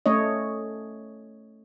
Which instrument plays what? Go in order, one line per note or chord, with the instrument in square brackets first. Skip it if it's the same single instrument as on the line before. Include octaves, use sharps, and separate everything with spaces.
[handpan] A3 C#4 C#5 D#5